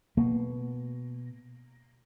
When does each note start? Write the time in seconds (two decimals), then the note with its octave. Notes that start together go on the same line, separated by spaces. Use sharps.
0.17 B2 A#3